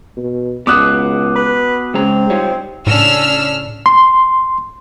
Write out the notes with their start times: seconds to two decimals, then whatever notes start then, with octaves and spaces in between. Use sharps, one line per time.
0.17 B2
0.67 C#2 B3 F#4 D6 D#6 F#6
1.35 B4
1.94 C#3 G#3 C4 A#5
2.30 G3 D#4 F4 C#5
2.87 A2 C#3 C#4 D4 E6 F6
3.86 C6